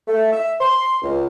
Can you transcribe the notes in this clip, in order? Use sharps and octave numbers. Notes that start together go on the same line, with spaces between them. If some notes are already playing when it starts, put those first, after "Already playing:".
A3
E5
C6
C#2